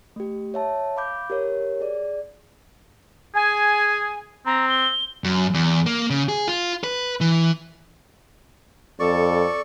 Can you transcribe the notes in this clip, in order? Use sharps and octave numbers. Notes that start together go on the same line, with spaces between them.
A3 G4
C#5 E5 A5
F5 B5 D6 G6
G4 A#4 C#5
G#4 D5
G#4 G#5
C4 A#5
G7
F#2
E2
A#3
C#3
G#4
F4
B4
E3
F2 A4 D5 C#6